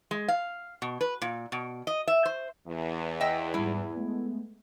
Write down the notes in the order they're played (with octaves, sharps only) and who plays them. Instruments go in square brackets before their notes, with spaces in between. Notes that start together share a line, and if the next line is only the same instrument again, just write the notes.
[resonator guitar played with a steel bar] G#3
F5
B2
B4
A#2
B2
D#5
E5
C5
[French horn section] E2
[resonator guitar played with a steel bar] D#5 E5 G5
[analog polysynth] G#2 G3 [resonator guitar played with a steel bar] E4
[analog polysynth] G#3 A3 B3